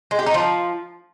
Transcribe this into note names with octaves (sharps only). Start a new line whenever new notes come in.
G#3
G4
D#4
F3